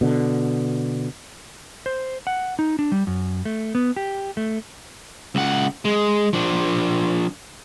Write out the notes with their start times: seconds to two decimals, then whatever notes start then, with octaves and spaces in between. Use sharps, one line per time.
0.01 B2 D3
1.86 C5
2.27 F#5
2.59 D#4
2.79 D4
2.92 G3
3.07 F#2
3.45 A3
3.75 B3
3.96 G4
4.37 A3
5.35 C#2 F#5
5.85 G#3
6.33 F3 D4